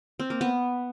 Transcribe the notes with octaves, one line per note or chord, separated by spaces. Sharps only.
C4
A#3
B3